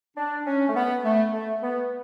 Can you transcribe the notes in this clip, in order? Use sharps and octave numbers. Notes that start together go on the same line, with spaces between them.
D4
C#4
A3
B3
A3
A3
B3